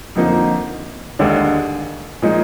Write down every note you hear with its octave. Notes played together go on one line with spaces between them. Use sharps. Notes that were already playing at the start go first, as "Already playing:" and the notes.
F2 D3 F3 A#3 D#4
D#2 D3 G#3 D4
A#2 F3 G#3 D#4